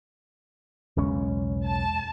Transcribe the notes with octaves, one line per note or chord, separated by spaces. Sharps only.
B1 E2 C#3 G#3 C#4
A5